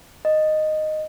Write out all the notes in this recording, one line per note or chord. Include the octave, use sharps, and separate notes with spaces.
D#5